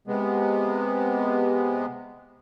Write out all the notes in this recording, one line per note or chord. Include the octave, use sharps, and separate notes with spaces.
C3 G#3 B3